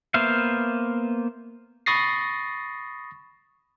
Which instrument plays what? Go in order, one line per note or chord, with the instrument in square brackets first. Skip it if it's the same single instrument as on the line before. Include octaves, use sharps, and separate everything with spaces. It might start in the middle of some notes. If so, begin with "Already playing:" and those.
[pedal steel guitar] A#3 B3 C5 E5 F5
[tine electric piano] B5 C#6 D#6 A6 A#6 C7